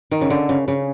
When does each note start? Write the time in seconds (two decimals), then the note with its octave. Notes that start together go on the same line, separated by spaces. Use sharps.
0.11 D#3
0.21 C#3
0.30 D3
0.49 C#3
0.68 C#3